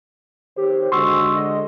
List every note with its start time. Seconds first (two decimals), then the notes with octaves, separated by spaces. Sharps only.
0.57 D#3 G4 C5 C#5
0.92 D3 G#3 F#4 C6 C#6 E6
1.36 D#5